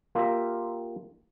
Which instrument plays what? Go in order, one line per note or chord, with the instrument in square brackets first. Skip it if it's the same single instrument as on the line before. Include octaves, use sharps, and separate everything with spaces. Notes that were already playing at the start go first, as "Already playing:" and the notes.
[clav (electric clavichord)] A#3 F4 G4 A#4 E5 A#5